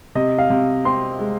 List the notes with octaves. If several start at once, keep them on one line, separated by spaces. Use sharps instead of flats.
C3 D#5
F5
C3
C4 C6
G#3